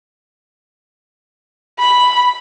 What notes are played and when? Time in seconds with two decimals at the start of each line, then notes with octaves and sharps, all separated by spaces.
1.79 B5